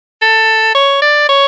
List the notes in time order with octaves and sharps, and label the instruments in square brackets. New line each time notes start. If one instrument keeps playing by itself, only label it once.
[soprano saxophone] A4
C#5
D5
C#5